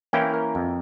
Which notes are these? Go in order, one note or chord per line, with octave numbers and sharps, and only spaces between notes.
E3 A#3 C#4 E4 G5
A#4
F2